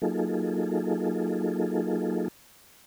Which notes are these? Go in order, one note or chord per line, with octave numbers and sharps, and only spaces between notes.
F#3 A#3 D#4 F4 G#4 A4